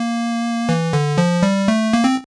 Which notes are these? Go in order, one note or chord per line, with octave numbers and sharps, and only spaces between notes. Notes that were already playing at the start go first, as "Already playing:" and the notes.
Already playing: A#3
E3
D3
F3
G3
A3
A#3
C4